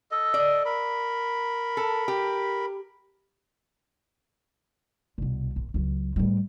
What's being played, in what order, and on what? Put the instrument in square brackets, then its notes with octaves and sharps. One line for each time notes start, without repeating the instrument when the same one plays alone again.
[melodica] A4 D#5
[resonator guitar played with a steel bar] D5
[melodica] A#4 B5
[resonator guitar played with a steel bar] A4
G4
[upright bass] C2 B2
A#1
C#2 F#3
A2 G3